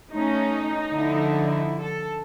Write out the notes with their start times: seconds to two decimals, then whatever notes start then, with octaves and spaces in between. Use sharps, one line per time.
0.12 A3 C#4 D#4
0.92 D3 F3 E4
1.82 A4